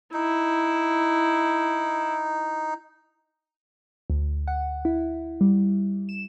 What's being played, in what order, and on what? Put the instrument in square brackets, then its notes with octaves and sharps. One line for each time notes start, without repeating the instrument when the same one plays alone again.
[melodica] D#4 [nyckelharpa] E4
[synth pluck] D2
F#5
E4
G3
E7